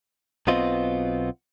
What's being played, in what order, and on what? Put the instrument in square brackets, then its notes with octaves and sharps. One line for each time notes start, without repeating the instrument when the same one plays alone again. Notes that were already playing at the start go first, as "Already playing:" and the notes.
[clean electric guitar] B1 B2 B3 C4 F4 D#5